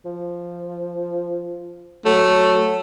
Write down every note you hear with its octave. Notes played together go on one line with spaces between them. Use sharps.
F3
F#3 A3